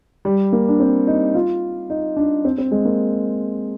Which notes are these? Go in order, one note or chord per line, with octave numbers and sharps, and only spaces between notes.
G3
A#3
D4
C4
D#4
F4
D#4
D4
C4
C4
G#3
A#3